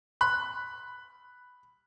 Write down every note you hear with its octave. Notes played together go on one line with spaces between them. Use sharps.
B5 F#6